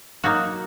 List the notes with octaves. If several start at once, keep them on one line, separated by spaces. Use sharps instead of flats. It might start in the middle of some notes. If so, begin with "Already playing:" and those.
F#3 A#3 D#4 F#4